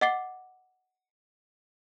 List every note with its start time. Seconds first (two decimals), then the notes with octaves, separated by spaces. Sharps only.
0.01 D#5 F#5 D6 A6 C7 G7